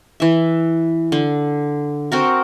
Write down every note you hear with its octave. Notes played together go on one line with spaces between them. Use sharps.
E3 E5
D3
C4 F#4 A#4